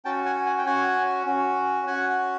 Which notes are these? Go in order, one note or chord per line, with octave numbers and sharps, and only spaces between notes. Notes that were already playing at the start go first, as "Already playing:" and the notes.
C#4 F#4 G5 A5
F#5 G#5
F#5 G#5
G5
C#4 F#4 F#5 G#5
C#4 F#4
C#4 F#4 F#5 G#5